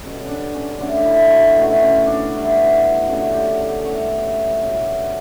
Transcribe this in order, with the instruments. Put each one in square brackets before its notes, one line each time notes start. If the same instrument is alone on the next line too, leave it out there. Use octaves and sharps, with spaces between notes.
[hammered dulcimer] B2 G3 C#4 A4
C#4
D4
C#4
D3 A3 C#4 D4
D4
E4
F#4
B2 A3 C#4
C#4
D4
E3 G3 B3
D3 A3 C#4 F#4
G4
A4
A2 E3 G3 C#4 C#5
E5
B2 F#3 C#4 E5
D5